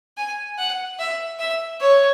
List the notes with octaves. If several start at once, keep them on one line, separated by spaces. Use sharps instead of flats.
G#5
F#5
E5
E5
C#5